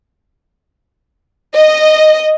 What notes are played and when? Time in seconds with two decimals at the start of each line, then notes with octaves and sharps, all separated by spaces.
1.54 D#5